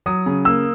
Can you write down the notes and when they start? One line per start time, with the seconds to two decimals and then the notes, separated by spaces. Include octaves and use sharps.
0.06 F#3 D#6
0.26 C#3
0.45 A#3 E6